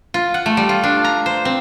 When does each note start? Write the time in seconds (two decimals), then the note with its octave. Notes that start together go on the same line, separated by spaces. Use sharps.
0.14 F4
0.34 F#5
0.46 A3
0.57 G3
0.69 F4
0.83 D4
1.04 A#5
1.26 C5
1.45 C4